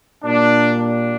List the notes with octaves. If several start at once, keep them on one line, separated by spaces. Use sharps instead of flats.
A#2 G3 A#3 D4
D4